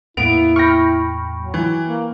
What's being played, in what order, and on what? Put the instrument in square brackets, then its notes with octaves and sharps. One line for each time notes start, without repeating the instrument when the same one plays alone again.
[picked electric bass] E2 A2 A#3 [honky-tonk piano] B3 D7 F7 [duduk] E4
[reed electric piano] G5 B5 C#6 [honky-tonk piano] F6 A#6
[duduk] F#3
[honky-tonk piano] E3
[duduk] A#3